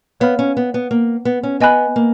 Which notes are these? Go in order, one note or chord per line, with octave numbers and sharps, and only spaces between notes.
B3 C#5 F5 B5 F6
C#4
B3
B3
A#3
B3
C#4
B3 D#5 G#5 B5 F#6
A#3